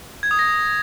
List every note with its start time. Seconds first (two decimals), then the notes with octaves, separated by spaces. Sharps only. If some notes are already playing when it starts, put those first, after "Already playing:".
0.23 G#6
0.31 D#6
0.39 A#6